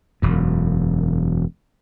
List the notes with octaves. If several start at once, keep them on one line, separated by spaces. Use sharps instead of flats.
E1 F#2